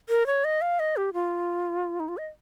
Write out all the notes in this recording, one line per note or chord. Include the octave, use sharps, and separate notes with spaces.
A#4
C#5
D#5
F5
D#5
G4
F4
D#4
F4
D#5